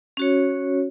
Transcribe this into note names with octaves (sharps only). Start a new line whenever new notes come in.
C#4 F#4 C#5